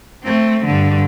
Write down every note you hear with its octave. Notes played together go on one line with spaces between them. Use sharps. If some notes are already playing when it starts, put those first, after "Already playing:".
A3 C4
G2 D3